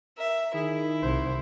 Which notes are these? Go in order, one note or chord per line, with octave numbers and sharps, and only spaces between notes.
A#4 E5
D#3 E4 G#4
C2 C5